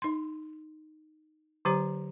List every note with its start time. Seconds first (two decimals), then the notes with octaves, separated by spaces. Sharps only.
0.02 D#4 C6
1.65 D3 F#3 G4 C5 A#5